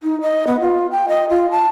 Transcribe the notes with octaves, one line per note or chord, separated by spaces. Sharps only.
D#4
D#5
B3
F4
G5
D#5
F4
A5